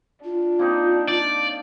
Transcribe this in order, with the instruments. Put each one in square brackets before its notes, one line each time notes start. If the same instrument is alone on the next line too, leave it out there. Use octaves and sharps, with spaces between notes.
[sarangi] D4 [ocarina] F4
[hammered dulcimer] A#3 C4 D#4
[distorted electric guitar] D5